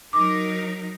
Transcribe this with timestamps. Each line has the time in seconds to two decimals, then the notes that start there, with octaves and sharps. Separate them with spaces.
0.13 F#3 D#4 A#4 D6